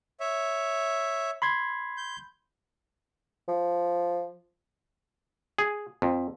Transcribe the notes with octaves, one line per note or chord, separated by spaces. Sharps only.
C#5 E5
B5 C6 G#6
G6
F3
G#4
F2